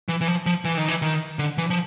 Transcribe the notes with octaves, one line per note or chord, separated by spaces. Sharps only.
E3
E3
F3
F3
E3
D#3
E3
D#3
D3
E3
F3